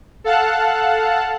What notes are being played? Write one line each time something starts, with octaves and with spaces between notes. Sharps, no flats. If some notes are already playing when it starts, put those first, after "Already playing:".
A4 F5 F#5 A5 F#6